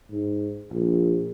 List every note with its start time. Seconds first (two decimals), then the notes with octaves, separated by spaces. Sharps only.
0.10 G#2
0.71 A#1